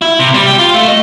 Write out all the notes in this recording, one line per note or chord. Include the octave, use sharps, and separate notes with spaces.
E4
C3
G3
G4
F4
A3
D#5